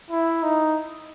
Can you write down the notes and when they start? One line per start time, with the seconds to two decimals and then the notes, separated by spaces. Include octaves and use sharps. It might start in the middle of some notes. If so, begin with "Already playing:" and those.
0.11 E4
0.43 D#4